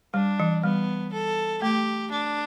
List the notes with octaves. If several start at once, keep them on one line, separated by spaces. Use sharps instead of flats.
G3 D4
E3
G3 B3
A4
A3 G4
D4